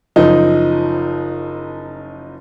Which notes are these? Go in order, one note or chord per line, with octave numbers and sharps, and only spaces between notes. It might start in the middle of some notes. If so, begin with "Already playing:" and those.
F#1 F3 D#4